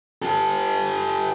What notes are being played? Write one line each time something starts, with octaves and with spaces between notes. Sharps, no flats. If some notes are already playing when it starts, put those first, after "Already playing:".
G4 A4